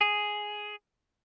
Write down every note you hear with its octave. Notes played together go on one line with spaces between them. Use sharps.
G#4